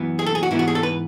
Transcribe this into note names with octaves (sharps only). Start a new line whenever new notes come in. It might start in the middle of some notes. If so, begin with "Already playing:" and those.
Already playing: F#2 E3 B3
G#4
A4
G#4
F#4
G#2 E3 B3 E4
F#4
G#4
A4
B4